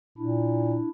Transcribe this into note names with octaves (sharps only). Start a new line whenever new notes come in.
A#2 D4 E4